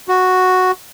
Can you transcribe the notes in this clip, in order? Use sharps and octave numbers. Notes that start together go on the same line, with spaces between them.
F#4